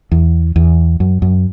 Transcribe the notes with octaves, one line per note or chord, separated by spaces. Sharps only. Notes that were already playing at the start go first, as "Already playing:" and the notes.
E2
E2
F#2
F#2